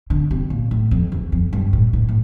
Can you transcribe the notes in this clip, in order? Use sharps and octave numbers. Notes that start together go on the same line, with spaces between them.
D3
C3
A#2
A2
F2
E2
F2
G2
A2
A2
A2